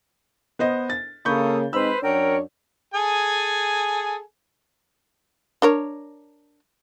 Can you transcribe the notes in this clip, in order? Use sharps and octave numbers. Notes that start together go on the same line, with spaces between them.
B3 C5 D#5
A6
C#3 A#3 A4 B5 C#6 D#6 G6
G#3 C4 D#4 B4 C5 B5 E6
F#2 D4 A#4 C#5 F#5 G5
G#4 A4 G#5
D4 A#4 C#5